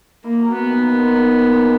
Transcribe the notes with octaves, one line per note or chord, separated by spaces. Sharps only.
A#3 E4
F#3
B3 C#4
D#3
A#2
G#3
D#4
A#2
G#3
C#4